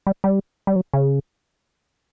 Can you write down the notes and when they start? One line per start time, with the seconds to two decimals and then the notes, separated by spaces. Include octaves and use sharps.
0.07 G3
0.24 G3
0.67 G3
0.76 F#3
0.94 C#3